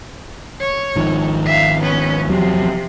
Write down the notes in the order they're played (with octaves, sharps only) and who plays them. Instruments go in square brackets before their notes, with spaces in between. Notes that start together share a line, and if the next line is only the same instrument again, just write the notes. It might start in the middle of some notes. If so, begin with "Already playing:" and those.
[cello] C#5
[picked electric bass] G#1 D#3 F3
[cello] E5 F5
B3 C#4
[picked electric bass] E2 F#3 [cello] C3 F3